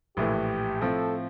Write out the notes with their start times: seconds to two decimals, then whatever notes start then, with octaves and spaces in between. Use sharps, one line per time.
0.17 A#1 A2 E3 A3 G4
0.82 A2 F3 C4 A4